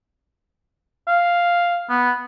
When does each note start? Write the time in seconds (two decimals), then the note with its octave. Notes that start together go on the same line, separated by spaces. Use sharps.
1.08 F5
1.90 B3